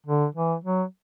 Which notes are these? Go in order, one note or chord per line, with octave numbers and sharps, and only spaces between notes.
D3
E3
F#3